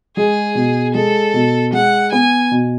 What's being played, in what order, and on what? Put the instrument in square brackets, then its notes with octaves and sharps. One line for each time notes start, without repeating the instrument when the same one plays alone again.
[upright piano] G#3 [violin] G#4
[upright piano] B2
[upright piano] G#3 [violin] A4
[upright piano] B2
[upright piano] G#3 [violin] F#5
[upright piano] B3 [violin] G#5
[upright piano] B2